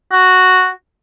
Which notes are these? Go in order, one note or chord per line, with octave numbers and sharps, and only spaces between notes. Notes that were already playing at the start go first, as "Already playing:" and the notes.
F#4